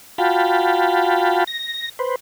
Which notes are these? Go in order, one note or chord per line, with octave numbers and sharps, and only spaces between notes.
F4 F#4 F5 G5 A5 B5
A#6
B4 C5